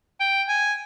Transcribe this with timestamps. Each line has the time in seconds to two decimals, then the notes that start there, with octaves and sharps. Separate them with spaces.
0.20 G5
0.48 G#5